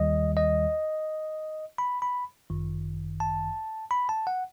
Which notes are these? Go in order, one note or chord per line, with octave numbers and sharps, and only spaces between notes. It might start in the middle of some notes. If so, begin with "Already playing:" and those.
Already playing: D#2 D#3 G3 D#5
D#5
B5
B5
G1 F#2 D#3
A5
B5
A5
F#5